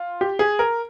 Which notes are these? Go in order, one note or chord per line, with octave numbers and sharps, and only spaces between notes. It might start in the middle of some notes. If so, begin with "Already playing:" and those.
Already playing: F4
G4
G#4
A#4